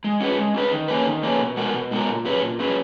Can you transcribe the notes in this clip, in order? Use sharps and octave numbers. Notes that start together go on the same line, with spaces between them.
G#3
C#4 G#4 B4
G#3
C#4 G#4 B4
D#3
A#3 C#4 G#4 B4
D#3
A#3 C#4 G#4 B4
B2
G#3 B3 F#4 A#4
B2
G#3 B3 F#4 A#4
A#2
F#3 C#4 G#4 B4
A#2
F#3 C#4 G#4 B4